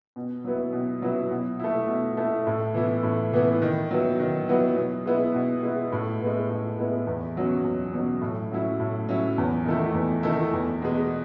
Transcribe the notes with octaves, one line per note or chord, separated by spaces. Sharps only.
B2
F#3 B3 E4
B2
F#3 B3 E4
B2
A3 E4
B2
A3 E4
A2
E3 B3 E4
A2
E3 B3 E4
D#3
F#3 B3 E4
D#3
F#3 B3 E4
B2
G#3 B3 E4
B2
G#3 B3 E4
A2
G#3 B3 E4
A2
G#3 B3 E4
E2
B2 F#3 C#4
E2
B2 F#3 C#4
A2
F#3 C#4 E4
A2
F#3 C#4 E4
E2
D#3 A3 E4
E2
D#3 A3 E4
E2
B2 G#3